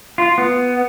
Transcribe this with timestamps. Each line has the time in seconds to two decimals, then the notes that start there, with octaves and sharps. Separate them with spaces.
0.18 F4
0.38 B3